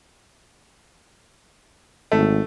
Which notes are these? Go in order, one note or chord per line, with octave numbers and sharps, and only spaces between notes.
G#1 A3